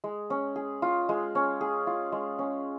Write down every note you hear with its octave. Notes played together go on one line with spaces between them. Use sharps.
G#3
C#4
G#4
F4
G#3
C#4
G#4
F4
G#3
C#4